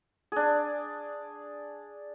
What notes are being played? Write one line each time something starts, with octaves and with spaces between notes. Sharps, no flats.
D4 G#4